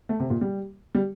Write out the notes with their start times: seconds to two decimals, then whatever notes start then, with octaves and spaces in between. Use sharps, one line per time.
0.09 A3
0.20 C3
0.30 A#2
0.41 G3
0.95 G3